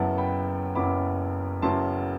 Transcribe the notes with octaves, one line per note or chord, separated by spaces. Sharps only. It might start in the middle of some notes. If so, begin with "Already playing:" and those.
Already playing: F#1 F#2 F#3 B3 E4 F#5 A5
G5 B5
F#1 F#2 F#3 B3 E4 B5 D6
F#1 F#2 F#3 B3 E4 A5 C6